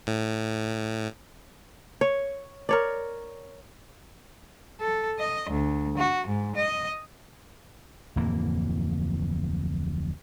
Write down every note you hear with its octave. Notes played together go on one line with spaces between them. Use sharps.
A2
C#5
A#4 C#5 D5
A4
D#5
D2
F#4
G#2
D#5
D1 F2 E3 A#3